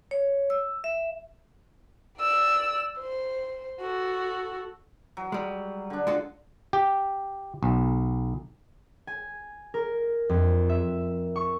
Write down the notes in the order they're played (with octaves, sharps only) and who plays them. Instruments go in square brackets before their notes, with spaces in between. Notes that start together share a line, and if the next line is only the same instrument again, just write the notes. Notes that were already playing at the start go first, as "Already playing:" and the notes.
[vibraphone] C#5
E6
E5
[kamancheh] D5 E6
C5
F#4 A4
[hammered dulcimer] F#3
[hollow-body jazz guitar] G3 G#3
[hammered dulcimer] D3 D4
[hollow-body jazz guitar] G#3 F4 F#4
[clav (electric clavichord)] G4
B1
[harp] G#5
A#4
F2
E5
C#6